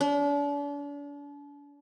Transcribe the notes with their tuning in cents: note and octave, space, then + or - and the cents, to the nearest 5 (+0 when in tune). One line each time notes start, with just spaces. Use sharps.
D4 -40